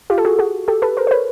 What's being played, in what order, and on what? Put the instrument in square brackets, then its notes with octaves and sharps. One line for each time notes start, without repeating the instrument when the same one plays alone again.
[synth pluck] F4 G4
A4
F#4 G#4
F#4 G#4
G4 A4
A4 B4
A#4 C5
C5
B4 C#5